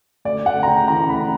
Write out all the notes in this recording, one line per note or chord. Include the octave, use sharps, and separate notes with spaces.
D2 D5
D2 F#5
A#5
C#3 G5
E3 A#5
D2 B5